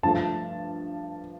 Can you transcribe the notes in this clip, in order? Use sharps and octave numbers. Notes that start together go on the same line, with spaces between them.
G2 F3 A3 A5